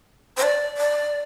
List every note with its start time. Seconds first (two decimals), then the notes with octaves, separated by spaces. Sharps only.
0.37 C5
0.43 D5
0.77 D5